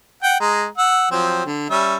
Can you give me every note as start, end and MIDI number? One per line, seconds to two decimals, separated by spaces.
0.23 0.39 78
0.23 0.39 79
0.40 0.66 56
0.40 0.66 82
0.78 1.07 78
0.78 1.07 88
1.11 1.43 53
1.11 1.43 54
1.11 1.43 60
1.46 1.70 50
1.70 1.96 55
1.70 1.96 61
1.70 1.96 76